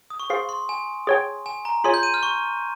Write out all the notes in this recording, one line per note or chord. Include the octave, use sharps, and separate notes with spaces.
D#6
C#6
G#4 C5 F5 C6
C6
G#5
G#4 C#5 G5
G#5
A#5
F4 G#4 C#5 G#5 C6
G6
D#7
F6
C#6